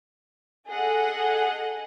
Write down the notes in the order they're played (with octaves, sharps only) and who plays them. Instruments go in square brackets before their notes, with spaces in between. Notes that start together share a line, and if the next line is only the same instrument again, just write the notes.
[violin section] G#4 A4 D#5 F#5